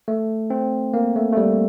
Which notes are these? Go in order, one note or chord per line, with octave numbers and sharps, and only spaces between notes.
A3
C4
A#3
A3
A3
G3